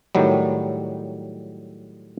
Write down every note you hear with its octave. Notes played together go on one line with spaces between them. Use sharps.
A2 D#3 F#3 G3